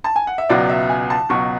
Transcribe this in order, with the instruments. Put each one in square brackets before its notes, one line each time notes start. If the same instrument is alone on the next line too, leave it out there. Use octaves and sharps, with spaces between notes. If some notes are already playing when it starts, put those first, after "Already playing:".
[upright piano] A5
G#5
F#5
E5
C#2 B2 F#3 D5
E5
G#5
A5
C#2 B2 F#3 C#6